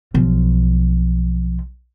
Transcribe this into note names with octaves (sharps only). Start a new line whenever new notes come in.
B1 F3